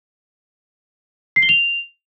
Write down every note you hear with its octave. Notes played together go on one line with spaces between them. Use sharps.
C7
G7
F7